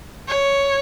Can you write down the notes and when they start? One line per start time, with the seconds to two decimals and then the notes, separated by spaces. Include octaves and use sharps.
0.28 C#5